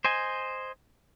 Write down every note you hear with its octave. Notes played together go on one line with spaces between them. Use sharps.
C5 D#5 G#5